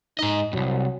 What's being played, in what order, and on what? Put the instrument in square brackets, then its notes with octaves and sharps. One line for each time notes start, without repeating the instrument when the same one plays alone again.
[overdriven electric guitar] G#2 D#5 [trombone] D#4
[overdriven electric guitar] C2 G2 [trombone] F#3